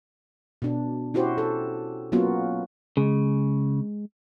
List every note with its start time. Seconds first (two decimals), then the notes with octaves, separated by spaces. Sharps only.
0.62 B2 D4
1.14 C#4 E4 F#4 G4 C5
1.38 A4
2.12 F#3 A#3 B3 C#4 F4 F#4
2.97 C#3 G#3